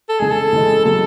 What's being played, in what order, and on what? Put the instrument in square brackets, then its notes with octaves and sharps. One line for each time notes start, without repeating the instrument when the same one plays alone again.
[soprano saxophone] A4
[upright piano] C#3 E3 G#3 [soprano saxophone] G#4
[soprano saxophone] A4
[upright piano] C#3 E3 G#3
[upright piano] C#3 F#3 [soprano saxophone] A4